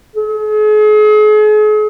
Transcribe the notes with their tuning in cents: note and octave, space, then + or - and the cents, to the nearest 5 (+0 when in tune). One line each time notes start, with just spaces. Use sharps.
G#4 +40